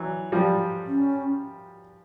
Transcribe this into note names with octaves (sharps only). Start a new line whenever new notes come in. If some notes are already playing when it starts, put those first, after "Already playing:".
Already playing: E3 F#3
F3 G3
C#4